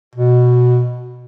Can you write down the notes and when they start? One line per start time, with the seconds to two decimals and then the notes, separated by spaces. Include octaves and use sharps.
0.16 B2